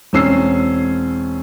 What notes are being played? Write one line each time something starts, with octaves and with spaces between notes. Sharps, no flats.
E1 C4 C#4 E6 C7